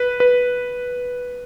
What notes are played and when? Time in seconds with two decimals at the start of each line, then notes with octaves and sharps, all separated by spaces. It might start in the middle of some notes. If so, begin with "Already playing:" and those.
Already playing: B4
0.20 B4